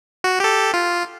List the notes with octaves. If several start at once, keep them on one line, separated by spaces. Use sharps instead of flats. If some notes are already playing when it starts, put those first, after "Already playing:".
F#4
G4 A4
F4